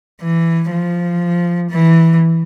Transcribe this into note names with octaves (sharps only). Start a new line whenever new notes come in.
E3
F3
E3